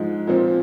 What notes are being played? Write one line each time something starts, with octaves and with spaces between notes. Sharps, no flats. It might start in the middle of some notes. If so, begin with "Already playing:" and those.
Already playing: G#2 F3 G#3
A#2 F3 C4